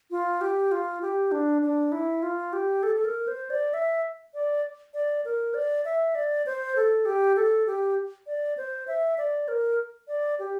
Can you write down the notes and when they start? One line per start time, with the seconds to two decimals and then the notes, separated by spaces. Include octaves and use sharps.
0.11 F4
0.41 G4
0.71 F4
1.02 G4
1.32 D4
1.62 D4
1.92 E4
2.23 F4
2.53 G4
2.83 A4
2.95 A4
3.05 A#4
3.27 C5
3.50 D5
3.74 E5
4.34 D5
4.94 D5
5.25 A#4
5.54 D5
5.85 E5
6.15 D5
6.46 C5
6.76 A4
7.05 G4
7.36 A4
7.67 G4
8.27 D5
8.57 C5
8.87 E5
9.18 D5
9.48 A#4
10.08 D5
10.39 G4